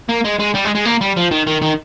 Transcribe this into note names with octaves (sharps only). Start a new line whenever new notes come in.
A#3
G#3
G#3
G3
G#3
G#3
A#3
G3
F3
D#3
D#3
D#3